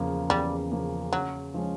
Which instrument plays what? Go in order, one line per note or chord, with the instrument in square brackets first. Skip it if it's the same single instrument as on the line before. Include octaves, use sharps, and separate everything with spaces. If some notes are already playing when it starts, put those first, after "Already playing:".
Already playing: [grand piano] E2 C#3 F3 A#3
[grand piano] E2 [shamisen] G3
[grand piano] C#3 F3 A#3
[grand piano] C#3 [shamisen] F#3
[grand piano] F3 G#3 C#4